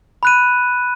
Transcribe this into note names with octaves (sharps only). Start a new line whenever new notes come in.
B5 F#6 D#7